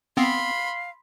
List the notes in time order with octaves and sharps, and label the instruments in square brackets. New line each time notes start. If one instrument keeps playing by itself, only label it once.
[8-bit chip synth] B3 C4 [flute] F5 [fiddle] B5 C6